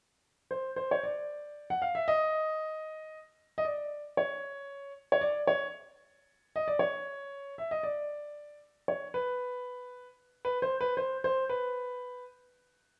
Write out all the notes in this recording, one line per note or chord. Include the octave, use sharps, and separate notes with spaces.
C5
C5
C#5
D5
F#5
F5
E5
D#5
D#5
D5
C#5
C#5
D5
C#5
D#5
D5
C#5
E5
D#5
D5
C#5
B4
B4
C5
B4
C5
C5
B4